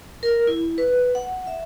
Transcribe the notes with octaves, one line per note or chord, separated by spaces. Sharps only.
A#4
E4
B4
F#5
E5